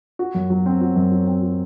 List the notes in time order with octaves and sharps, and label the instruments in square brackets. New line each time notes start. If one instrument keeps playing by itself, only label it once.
[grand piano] F#4
F#2
F#3
C4
F#4
F#2
F#3
C4
F#4